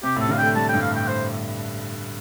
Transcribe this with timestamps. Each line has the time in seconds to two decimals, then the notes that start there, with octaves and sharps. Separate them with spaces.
0.03 C3 G4
0.16 A2 A4
0.29 D3 F5
0.38 A3 G5
0.56 G3 A5
0.69 G5
0.73 G2
0.82 F5
0.91 A2 G5
1.08 C5